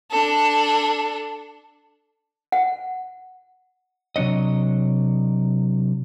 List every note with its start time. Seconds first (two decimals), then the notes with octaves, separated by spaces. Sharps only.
0.11 D4 A4
2.52 F#5
4.16 C3 F#3 D4 C#5 D#5